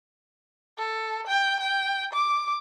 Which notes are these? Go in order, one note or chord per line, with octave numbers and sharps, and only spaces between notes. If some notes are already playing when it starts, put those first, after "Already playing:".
A4
G5
G5
D6